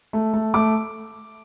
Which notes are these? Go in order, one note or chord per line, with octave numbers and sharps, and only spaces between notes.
A3
A3
A3 D6